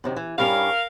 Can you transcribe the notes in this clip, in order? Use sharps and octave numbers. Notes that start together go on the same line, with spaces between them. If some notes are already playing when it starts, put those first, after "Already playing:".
F#2 C3 D#3
E3
G2 G3 C#4 A#4 F5